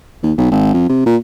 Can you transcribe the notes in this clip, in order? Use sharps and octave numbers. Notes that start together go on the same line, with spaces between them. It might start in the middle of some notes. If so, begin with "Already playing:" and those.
D#2
B1
G#1
F2
C3
A#2